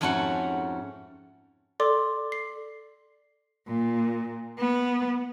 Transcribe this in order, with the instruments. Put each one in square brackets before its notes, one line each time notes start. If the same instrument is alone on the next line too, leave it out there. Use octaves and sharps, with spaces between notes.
[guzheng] F2 G#2 A3 C#4 F#4 F#5
[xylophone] A4 D5 C6 D6
C7
[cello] A#2
B3